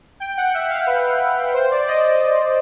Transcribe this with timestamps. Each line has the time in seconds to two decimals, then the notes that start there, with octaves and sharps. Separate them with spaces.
0.20 G5
0.37 F#5
0.54 E5
0.70 F5
0.87 B4
1.54 C5
1.71 D5
1.88 D#5
2.04 D#5